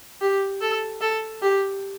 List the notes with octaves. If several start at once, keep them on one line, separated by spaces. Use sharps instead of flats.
G4
A4
A4
G4